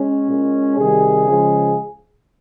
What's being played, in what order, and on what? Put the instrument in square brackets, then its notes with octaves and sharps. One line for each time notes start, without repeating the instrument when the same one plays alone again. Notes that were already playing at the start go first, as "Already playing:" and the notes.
Already playing: [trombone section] G#3 C#4
A#2 G#3
C3 D#3 G3 G#4
C#3 F3 G#3